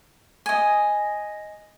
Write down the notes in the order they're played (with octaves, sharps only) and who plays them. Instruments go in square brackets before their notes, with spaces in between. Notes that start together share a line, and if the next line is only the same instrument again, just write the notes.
[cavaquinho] D#5 G#5